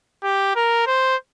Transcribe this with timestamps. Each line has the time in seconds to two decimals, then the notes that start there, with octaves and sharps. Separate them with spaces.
0.24 G4
0.56 A#4
0.87 C5